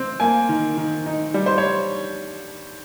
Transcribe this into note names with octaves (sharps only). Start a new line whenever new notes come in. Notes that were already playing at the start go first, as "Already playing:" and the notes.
Already playing: C4
A#3 G#5
D#3
D#3
D#4
G3
C5
C#5